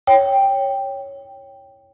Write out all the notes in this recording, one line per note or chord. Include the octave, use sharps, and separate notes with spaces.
C#5 G5